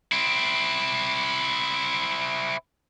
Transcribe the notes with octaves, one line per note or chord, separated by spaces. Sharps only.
C4 E4